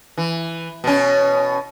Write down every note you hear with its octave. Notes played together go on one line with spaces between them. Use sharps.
E3
B2 C#4